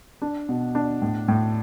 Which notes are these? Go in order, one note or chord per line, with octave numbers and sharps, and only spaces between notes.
D4
B2
D4
A2
A2